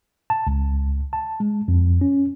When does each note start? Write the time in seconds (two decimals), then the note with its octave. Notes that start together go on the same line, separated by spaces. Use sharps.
0.30 A5
0.47 C#2
1.13 A5
1.40 G#3
1.68 F2
2.01 C#4